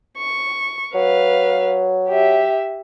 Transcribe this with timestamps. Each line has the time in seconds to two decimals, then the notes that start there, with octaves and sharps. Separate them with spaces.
0.18 C#6
0.95 F#3 B4 F5
2.09 G4 E5